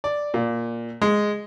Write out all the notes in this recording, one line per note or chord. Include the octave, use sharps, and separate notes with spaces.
D5
A#2
G#3